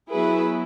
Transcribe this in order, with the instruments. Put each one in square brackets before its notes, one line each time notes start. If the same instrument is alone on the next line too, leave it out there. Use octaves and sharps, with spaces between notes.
[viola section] F#3 B3 E4 G#4 B4